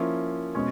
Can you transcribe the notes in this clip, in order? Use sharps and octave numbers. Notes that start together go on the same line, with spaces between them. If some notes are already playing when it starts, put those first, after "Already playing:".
Already playing: F3 A#3 C#4 E4
B2 G#3 C#4